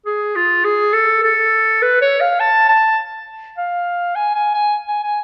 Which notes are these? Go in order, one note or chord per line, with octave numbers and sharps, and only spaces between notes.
G#4
F4
G#4
A4
A4
B4
C#5
F5
A5
A5
F5
G#5
G#5
G#5
G#5
G#5